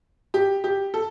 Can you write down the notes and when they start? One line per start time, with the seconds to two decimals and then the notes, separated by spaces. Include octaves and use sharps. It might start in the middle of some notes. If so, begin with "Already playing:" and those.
0.34 G4
0.64 G4
0.94 A4